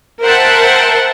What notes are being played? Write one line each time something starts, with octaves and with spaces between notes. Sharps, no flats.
A#4 C5 E5 F#5 G5 A5